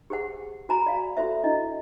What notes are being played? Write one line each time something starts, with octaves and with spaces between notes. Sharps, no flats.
G4 G#4 C5 F#5
F#4 C5 G#5 A#5 B5
D5 F5
F4 F#4 A4 C5 E5
D4 E4 D#5